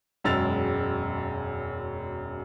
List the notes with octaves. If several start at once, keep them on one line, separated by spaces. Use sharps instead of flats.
E1 F#2 G#3 E6 A6 F7